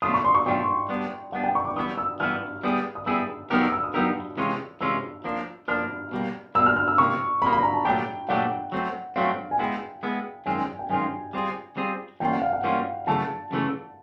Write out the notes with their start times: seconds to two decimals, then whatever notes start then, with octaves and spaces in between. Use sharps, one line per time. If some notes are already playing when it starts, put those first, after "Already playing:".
0.02 B2 F#3 A3 D4 F4 D#6
0.14 C#6
0.25 C6
0.35 C#6
0.46 B2 F#3 A3 D4 F4 G5
0.89 G3 B3 D4
1.32 G3 B3 D4 F#5
1.44 G5
1.55 C#6
1.65 D6
1.76 E3 G3 B3 E4 D#6
1.98 E6
2.20 E3 G3 B3 E4 F6
2.63 G3 B3 E4 G#4
2.95 D#6
3.06 G3 B3 E4 G#4 E6
3.50 F#3 B3 D#4 G4 A#4 F6
3.61 E6
3.72 E6
3.83 D#6
3.94 F#3 B3 D#4 G4 A#4 E6
4.38 C3 E3 G#3 C#4 F4
4.81 C3 E3 G#3 C#4 F4 E6
5.24 F3 A#3 D4
5.68 F3 A#3 D4 F6
6.12 B2 G3 A#3
6.55 B2 G3 A#3 E6
6.66 F6
6.76 F6
6.88 E6
6.98 C3 F3 A#3 C#6
7.42 C3 F3 A#3 B5
7.53 B5
7.63 A#5
7.74 A5
7.85 A#2 F#3 A3 D4 G4 G5
8.29 A#2 F#3 A3 D4 G4 F#5
8.72 F#3 A3 C4
9.16 F#3 A3 C4 F5
9.51 G#5
9.59 G#3 B3 E4 G5
10.03 G#3 B3 E4
10.46 F#2 D#3 G#3 C4 F4 G#5
10.58 G#5
10.79 G5
10.90 F#2 D#3 G#3 C4 F4 G#5
11.33 G3 C4 F4 G#4
11.77 G3 C4 F4 G#4
12.20 E3 G3 A#3 C#4 F4 G5
12.31 F#5
12.42 F5
12.53 F#5
12.63 E3 G3 A#3 C#4 F4
13.07 F#2 C#3 E3 A3 A5
13.51 F#2 C#3 E3 A3